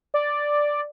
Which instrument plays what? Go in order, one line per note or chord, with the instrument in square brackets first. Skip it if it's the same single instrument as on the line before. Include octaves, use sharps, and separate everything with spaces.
[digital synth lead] D5